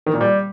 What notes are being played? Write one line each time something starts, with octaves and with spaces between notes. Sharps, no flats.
D#3
A#2
G3